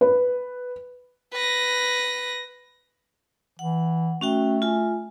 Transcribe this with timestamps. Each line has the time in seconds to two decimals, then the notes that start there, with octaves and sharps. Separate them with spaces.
0.01 B4
1.33 B4 A#6
3.59 E3 F#5
4.21 A3 C#4 F#4 G5
4.62 F4 G#5